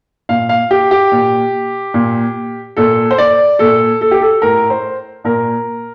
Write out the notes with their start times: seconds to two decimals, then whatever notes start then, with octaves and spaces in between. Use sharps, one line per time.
0.29 A#2 F5
0.49 F5
0.71 G4
0.91 G4
1.12 A#2
1.94 A#2
2.77 A#2 A4
3.11 C5
3.18 D5
3.59 A#2 A4
4.01 A4
4.11 G4
4.22 A4
4.42 A2 A#4
4.70 C5
5.24 A#2 A#4